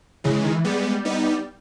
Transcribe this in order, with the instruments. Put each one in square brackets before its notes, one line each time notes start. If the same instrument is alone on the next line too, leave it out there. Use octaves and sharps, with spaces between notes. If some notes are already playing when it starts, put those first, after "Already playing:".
[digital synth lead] C#3 [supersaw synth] E3 G#3
[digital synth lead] C#3
D#3
E3
[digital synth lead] G3 [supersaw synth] G#3 B3
[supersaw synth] B3 D#4